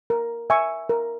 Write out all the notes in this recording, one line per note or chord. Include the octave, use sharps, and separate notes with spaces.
A#4
E5 G#5 C#6
A#4